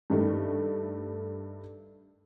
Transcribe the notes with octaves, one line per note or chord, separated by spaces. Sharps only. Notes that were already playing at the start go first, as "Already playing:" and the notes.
G2 D#3 A3